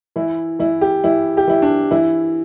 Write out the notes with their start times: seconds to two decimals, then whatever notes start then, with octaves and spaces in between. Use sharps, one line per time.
0.16 E3 E4
0.59 E3 E4
0.81 G4
1.04 E3 E4
1.37 G4
1.47 E3 E4
1.62 D4
1.91 E3 E4